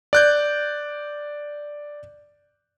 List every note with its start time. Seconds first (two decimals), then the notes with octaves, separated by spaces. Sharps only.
0.13 D5 F#6 G6